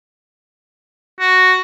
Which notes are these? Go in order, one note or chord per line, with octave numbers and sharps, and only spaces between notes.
F#4